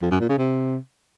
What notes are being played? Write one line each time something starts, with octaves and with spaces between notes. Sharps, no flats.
F2
F#2
A#2
C#3
C3